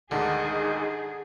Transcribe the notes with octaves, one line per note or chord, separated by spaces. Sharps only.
D2 G#2 D3 D#3 D#4 G#4